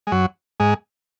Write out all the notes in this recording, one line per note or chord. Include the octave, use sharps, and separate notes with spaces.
G#3
F#2 F#3
G#2 G#3